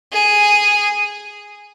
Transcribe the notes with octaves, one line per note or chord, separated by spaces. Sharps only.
G#4